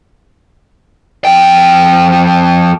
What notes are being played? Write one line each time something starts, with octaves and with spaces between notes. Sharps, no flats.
F2 G5